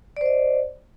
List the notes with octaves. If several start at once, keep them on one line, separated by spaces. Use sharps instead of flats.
C5 D5 D#5